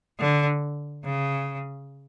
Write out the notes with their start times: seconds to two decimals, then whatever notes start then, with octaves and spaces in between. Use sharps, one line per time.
0.19 D3
1.05 C#3